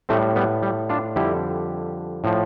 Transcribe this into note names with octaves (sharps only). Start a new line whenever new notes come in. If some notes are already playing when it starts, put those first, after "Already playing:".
A2 G3 A3 C4
G3 B3
G3
D4 F4
F2 D3 G3 E4 G4
A2 F3